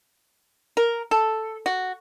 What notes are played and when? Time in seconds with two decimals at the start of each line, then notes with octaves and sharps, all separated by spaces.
0.77 A#4
1.11 A4
1.66 F#4